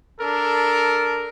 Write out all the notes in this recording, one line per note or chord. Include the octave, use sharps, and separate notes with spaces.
D4 A4 A#4